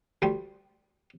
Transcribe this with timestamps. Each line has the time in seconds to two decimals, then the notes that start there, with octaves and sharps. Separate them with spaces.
0.22 D2 G3 G5 C6